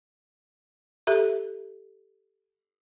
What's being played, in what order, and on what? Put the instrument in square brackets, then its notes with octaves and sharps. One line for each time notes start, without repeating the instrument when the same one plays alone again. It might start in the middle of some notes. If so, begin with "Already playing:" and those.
[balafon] G4 A4 E5